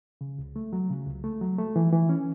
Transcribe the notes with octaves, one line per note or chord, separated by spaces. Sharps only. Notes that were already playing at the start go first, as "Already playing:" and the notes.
C#3
C#2
A3
F#3
C#3
C#2
A3
F#3
A3
E3
E3
C#4